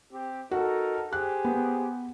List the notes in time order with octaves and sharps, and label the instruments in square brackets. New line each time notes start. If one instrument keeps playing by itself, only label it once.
[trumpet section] C4 G4
[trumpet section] D#4 A4 A#4 [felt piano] F#4
[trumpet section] G4 G#4 C5 [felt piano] F#6
[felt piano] B3